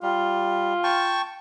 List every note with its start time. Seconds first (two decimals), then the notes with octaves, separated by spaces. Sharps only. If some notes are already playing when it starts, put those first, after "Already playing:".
0.03 G3 F4
0.84 G5 A5 C#6